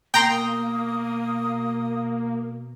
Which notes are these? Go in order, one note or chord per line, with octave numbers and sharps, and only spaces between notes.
B2 A#3 G5 A#5 C6 D#6